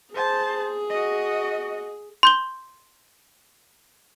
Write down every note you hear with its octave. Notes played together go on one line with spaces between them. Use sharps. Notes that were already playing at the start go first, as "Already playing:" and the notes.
G#4 C5 A5
F#4 D#5
C6 G6 G7